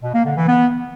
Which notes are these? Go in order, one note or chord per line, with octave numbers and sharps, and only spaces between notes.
B2
A#3
D3
E3
B3